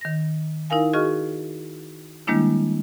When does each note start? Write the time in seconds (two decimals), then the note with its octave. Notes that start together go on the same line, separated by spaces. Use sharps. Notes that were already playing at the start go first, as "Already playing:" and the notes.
0.01 D#3 A#6
0.70 D#4 E4 A#4 F5 G#5
0.93 F#4 G#4 D#5 C#6 F6
2.27 D#3 G3 G#3 A#3 D4 E4